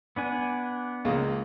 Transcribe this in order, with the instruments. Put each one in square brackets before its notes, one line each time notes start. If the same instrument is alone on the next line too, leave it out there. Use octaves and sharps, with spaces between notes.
[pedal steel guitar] B3 D4 G#5
[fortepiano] C#2 G#3 A#3